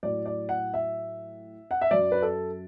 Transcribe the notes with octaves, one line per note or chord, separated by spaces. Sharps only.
A2 F#3 D5
D5
F#5
E5
F#5
E5
F#2 F#3 D5
B4
A4